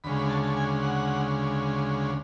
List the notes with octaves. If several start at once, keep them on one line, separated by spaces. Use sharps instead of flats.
D2 C#3 G#3 B5
B5
A5
A5
G#5
F#5